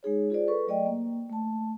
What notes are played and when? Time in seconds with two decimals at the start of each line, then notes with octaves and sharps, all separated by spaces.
0.03 G#3 D#4 G#4 C#5
0.30 F4 G#4 C5 D5
0.48 A4 B4 C#6
0.67 F#3 A3 D5 D#5 G5
0.86 A#3
1.30 A3 A5